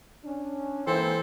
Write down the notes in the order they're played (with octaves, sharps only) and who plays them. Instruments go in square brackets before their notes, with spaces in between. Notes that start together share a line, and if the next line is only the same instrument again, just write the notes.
[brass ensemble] C#4 D4
[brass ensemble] G#2 A#3 [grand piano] E3 [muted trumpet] C4 [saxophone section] E4 A4 C5